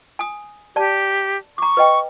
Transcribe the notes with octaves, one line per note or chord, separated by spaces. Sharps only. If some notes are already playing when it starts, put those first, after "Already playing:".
G#5 D#6
G4 D5 A5
A#5 C#6 D6
B4 D#5 G5